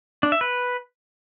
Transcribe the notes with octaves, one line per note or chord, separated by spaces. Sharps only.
D4
E5
B4